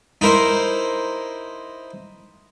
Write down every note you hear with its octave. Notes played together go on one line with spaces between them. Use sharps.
D#4 E4 A#4 C5